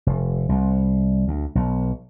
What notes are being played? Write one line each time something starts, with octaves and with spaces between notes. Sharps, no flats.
F1
C2
D2
B1